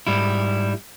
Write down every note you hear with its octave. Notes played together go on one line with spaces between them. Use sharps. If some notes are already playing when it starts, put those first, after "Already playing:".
G#2 G3 E4